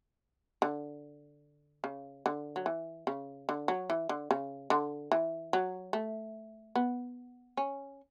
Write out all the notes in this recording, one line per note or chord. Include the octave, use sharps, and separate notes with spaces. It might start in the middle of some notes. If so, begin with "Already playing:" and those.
D3
C#3
D3
F#3
E3
C#3
D3
F#3
E3
D3
C#3
D3
E3
F#3
A3
B3
C#4